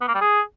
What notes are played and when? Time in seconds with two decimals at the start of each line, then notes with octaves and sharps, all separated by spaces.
0.01 B3
0.08 A#3
0.14 G3
0.21 G#4